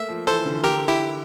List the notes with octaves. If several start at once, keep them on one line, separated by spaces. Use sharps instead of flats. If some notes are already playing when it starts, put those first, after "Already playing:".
Already playing: A3 A#3 E5
F3
E3 A4 C5
D3
E3
D3 G4 A#4
E4 G4